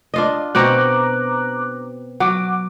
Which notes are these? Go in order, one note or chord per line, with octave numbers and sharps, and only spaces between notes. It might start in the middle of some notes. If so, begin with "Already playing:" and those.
D4 F4 D#5
B2 C4 F#4 A#5 D6 F#6
F#3 F#5 D6